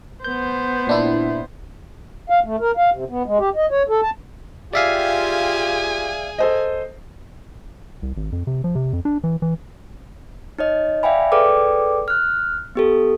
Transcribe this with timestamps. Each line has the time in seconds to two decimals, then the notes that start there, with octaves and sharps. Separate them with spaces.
0.24 B3 C5 G6
0.87 A#2 D4 E4
2.30 F5
2.44 A3
2.60 A#4
2.77 F5
2.92 C3
3.09 B3
3.26 G#3
3.39 G4
3.56 D#5
3.71 C#5
3.89 A4
4.02 A5
4.73 F4 G4 G#4 D5 E5 F5 G#5
6.38 A4 C5 D#5
8.02 C2
8.16 G#1
8.32 F2
8.47 C3
8.64 F3
8.75 C3
8.93 F2
9.05 D4
9.24 E3
9.42 E3
10.59 D#4 C#5 D#5
11.03 D5 E5 F5 G5 G#5 B5
11.32 G#4 A4 B4 D5 G5 D6
12.08 F6 F#6
12.75 B3 G4 A4